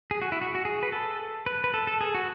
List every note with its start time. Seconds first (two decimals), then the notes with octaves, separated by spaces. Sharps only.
0.11 G#4
0.22 F#4
0.32 E4
0.41 F#4
0.55 F#4
0.65 G#4
0.83 B4
0.92 A4
1.46 B4
1.64 B4
1.74 A4
1.87 A4
2.01 G#4
2.15 F#4